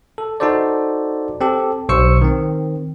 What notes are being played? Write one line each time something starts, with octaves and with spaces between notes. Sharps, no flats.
A4
D#4 F#4 A4 C5 D5
C4 G4 A4
B1 C5 C#6 E6 C#7
D#3 C4